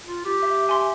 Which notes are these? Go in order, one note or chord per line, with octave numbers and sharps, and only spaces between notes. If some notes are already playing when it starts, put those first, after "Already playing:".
F4
G4
E5
E5 G#5 C6